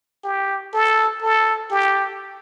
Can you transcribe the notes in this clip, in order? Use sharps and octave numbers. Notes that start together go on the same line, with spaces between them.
G4
A4
A4
G4